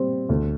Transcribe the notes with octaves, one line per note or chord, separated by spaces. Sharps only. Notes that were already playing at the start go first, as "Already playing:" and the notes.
Already playing: A#2 G3 C4
D2